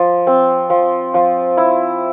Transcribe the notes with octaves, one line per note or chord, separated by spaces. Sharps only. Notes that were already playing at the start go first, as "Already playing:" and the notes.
Already playing: F3
C4
F3
F3
E4